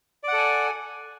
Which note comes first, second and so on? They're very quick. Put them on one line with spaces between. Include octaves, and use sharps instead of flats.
D5 F#5 A4 G#5